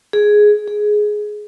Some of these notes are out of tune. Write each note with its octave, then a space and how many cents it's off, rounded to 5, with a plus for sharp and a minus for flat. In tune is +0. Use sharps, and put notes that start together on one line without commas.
G#4 +5
G#4 +10